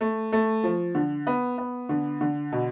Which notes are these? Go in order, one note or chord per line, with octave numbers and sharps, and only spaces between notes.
A3
A3
F3
D3
B3
B3
D3
D3
B2